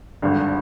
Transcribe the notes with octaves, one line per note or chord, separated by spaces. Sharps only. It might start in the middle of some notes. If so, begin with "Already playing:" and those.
G#1 G2 D3